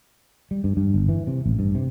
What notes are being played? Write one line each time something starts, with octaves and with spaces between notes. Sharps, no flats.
G3
G2
G2
G1
E3
C3
A1
G2
C3